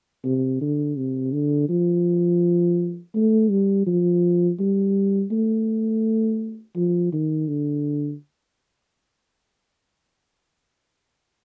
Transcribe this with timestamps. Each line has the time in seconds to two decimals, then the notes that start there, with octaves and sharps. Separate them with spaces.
0.25 C3
0.61 D3
0.96 C3
1.33 D3
1.69 F3
3.15 A3
3.50 G3
3.86 F3
4.59 G3
5.31 A3
6.76 F3
7.13 D#3
7.48 D3